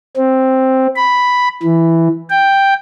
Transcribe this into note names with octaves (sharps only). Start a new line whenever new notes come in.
C4
B5
E3
G5